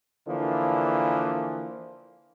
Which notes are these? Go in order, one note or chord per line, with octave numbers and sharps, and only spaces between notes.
D3 E3 F3 A#3